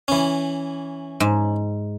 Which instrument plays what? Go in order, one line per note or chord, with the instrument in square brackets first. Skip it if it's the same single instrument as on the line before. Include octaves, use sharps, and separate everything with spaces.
[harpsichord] E3 C#4
[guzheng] G#2